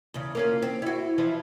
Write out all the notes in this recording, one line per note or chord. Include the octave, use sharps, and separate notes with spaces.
E2 C#3
A#3 C#4 F4
C4
E4 F#4
E3 F3 E4